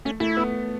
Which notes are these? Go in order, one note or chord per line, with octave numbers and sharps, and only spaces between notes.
A3 C#4
A3 E4
B3